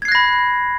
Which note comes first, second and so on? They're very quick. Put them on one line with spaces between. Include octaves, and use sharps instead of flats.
G#6 C7 F#6 A#6 B5